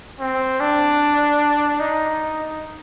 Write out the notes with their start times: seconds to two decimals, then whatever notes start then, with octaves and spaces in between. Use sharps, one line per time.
0.20 C4
0.60 D4
1.80 D#4